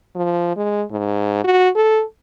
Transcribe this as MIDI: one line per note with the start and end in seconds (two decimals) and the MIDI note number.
0.15 0.52 53
0.56 0.83 56
0.91 1.43 44
1.44 1.69 66
1.75 2.03 69